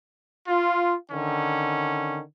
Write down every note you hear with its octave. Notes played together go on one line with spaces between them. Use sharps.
F4
D3 D#3 C#4